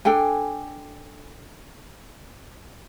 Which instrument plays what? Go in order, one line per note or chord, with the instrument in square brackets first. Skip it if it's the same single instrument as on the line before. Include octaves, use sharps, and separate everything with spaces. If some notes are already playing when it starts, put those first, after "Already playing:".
[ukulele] D4 A4 G5 G#5